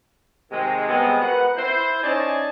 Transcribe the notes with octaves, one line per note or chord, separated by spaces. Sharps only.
C3 D#3 G#3
C3 G3 G#3 B3 G#4
A#4 B4 F#5
E4 C5
C#4 D#4 D5 G#5 A5